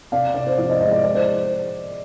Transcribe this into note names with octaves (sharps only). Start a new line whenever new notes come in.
C3 D5 F5
C3 D5
C5
F3 D5
C5 D#5
G#3 C5 D#5
D5
G#3 D5
C5